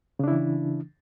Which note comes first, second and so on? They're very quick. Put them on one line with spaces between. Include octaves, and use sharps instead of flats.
C#3 D4 E4 E3